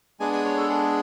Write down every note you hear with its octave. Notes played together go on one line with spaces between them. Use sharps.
G#3 B3 D4 G#4 G#5
G#5
C#5
A4
G#4